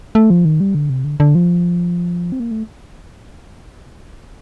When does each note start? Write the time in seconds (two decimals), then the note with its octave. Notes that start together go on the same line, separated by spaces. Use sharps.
0.15 A3
0.30 F3
0.45 D#3
0.60 G3
0.75 D3
0.90 C3
1.04 D3
1.20 D3
1.35 F3
2.32 C4
2.40 A#3
2.51 A3